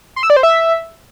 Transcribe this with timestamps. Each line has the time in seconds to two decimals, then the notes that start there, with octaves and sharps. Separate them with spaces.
0.16 C6
0.23 E6
0.30 D5
0.37 C5
0.43 E5